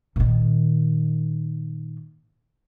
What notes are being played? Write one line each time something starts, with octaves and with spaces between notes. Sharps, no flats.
A#2 D#3